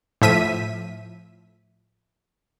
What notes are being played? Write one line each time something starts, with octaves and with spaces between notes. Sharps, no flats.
A2 F3 E5 B6 D#7